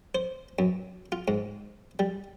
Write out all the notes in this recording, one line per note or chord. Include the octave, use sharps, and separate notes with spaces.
C5
F#2
F4
G#2
G3